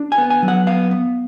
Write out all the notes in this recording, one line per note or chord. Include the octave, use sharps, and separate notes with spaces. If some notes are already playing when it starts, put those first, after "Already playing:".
Already playing: D4
G#5
B3
G#5
F#3
F#5
B3 F5
B3